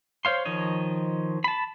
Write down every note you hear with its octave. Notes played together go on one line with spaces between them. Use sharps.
C5 C#5 F5 C6
D#3 F3 C#5 D#5
A5 B5